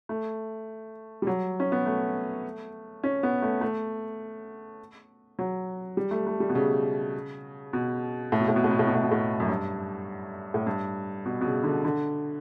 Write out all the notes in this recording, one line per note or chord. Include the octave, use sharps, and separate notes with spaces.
A3
G3
F#3
C#4
B3
A3
C#4
B3
A3
A3
F#3
G3
A3
A3
G3
B2
C#3
B2
A2
B2
A2
B2
A2
B2
A2
B2
A2
B2
A2
F#2
G2
A2
G2
B2
B2
C#3
D3
D3